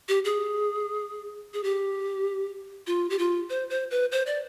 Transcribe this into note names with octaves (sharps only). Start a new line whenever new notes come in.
G4
G#4
G#4
G4
F4
G4
F4
C5
C5
B4
C5
D5